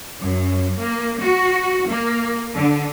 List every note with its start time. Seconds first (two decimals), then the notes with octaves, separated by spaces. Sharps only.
0.22 F#2
0.79 A#3
1.21 F#4
1.88 A#3
2.54 D3